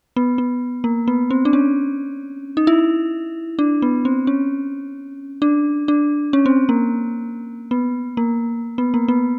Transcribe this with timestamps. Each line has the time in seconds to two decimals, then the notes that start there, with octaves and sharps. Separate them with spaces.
0.16 B3
0.38 B3
0.84 A#3
1.08 B3
1.30 C4
1.45 D4
1.53 C#4
2.57 D#4
2.67 E4
3.59 D4
3.82 B3
4.05 C4
4.27 C#4
5.42 D4
5.88 D4
6.33 C#4
6.46 C4
6.69 A#3
7.71 B3
8.17 A#3
8.78 B3
8.94 A#3
9.08 B3